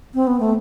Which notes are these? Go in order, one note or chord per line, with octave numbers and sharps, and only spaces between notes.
C4
B3
A3